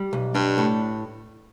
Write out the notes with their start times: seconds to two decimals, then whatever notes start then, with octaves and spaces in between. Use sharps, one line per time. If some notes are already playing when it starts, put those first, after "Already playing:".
Already playing: G3
0.13 B1
0.35 G2 D4
0.58 A2